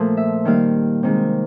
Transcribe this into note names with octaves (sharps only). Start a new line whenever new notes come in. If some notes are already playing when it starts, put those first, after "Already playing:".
Already playing: A#2 F3 A3
E5
D#3 G3 A#3 F5
C3 D#3 G#3